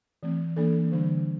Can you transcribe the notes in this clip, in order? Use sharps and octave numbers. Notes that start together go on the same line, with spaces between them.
E3 A3 C4
E3 A#3 D4 A4
D3 G3 D4